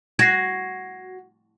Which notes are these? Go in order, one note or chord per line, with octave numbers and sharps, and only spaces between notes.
F#4 G#6 A#6 C7